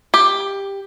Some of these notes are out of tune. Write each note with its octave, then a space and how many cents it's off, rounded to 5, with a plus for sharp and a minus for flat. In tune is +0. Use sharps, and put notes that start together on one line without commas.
G4 +10